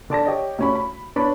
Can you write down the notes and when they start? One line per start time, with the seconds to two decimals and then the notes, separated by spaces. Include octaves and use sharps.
0.10 D3 D5 A5 A#6
0.26 G4 C#5 D#5
0.59 D2 C#4 B5
0.75 B5
1.16 B3 D4 C#5 D5 A5 B5